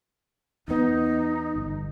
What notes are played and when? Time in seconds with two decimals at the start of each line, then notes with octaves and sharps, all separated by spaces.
0.68 E2 B3 D#4
1.56 G1